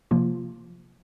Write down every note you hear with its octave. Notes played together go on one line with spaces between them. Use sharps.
C3 F3 A#3 F4